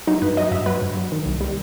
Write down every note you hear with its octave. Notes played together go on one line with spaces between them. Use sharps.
F#3 D#4
G2 B4
F#3 D#5
G2 E5
F#3 B4
G2
F#3
D#3
C2
G3